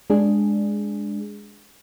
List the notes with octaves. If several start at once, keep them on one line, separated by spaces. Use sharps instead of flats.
G#3 D4 G#4